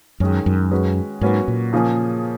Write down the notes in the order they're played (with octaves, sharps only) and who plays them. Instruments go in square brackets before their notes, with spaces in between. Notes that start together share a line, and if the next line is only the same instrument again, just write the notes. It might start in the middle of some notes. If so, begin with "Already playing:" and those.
[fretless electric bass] F#2 [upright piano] D#3 G#3 C#4
[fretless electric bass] F#2
[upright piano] G#3 C#4 F#4 B4
[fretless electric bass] G#2 [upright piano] F#3 A#3 C#4 F#4 B4
[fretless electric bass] A#2
[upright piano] C#3 F3 A#3 C#4 G#4